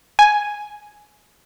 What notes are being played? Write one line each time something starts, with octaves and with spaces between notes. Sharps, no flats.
G#5